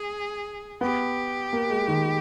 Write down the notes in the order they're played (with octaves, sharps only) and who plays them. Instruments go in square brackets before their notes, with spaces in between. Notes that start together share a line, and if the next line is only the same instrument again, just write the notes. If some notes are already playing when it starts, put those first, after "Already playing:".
Already playing: [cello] G#4
[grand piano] B3 [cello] G4
[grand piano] A#3
G#3
D#3